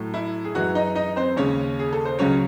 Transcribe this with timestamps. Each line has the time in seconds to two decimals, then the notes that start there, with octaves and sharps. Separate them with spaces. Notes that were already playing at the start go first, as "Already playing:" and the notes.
Already playing: A2 F#3 A3
0.14 E4
0.45 G#4
0.55 F#2 E3 G#3 F#4
0.75 D#4 D#5
0.95 D#4 D#5
1.16 C4 C5
1.36 D#2 C#3 G#3 C#4 C#5
1.79 G#4
1.93 A4
2.05 C5
2.19 C#2 C#3 F#3 C#4 C#5